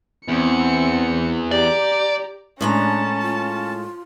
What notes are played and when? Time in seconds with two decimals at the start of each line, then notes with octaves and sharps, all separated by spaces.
0.28 E2 C4 C#7
1.51 G4 D5 A#5
2.61 A2 G#3 C#4 D4 A5 A#5
3.22 F4